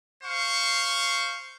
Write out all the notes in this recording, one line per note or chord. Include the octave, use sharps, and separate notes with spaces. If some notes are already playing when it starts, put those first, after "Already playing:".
C5 F5 C#6